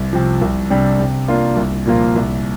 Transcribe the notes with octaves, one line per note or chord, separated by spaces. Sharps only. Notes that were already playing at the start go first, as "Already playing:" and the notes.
Already playing: C2
C3 F3
C2
C3 G3 D4
C3
A#3 D4 F4
C2
A#2 F3 A#3 F4
C2